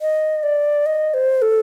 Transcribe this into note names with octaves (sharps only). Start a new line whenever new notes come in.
D#5
D5
D#5
C5
A4